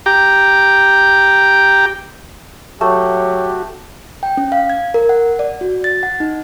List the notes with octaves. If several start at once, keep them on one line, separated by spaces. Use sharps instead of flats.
G4 G5 A#5 D6
F#3 A3 F#4 G4
G5
C#4
F5
G#6
A#4
F#5
D5
F#4
A6
F#5
D#4